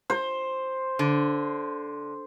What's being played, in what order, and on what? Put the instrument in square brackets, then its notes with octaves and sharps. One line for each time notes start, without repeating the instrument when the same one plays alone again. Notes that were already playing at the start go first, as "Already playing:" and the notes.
[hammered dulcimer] C5
[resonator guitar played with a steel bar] D3